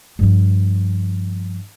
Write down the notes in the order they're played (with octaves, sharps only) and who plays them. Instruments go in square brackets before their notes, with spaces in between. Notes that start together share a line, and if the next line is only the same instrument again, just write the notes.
[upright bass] G2 F3